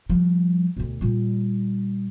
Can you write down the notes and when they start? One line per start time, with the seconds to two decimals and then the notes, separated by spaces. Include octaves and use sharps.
0.10 F3 G3
0.77 D2 B2
1.01 A#2 G3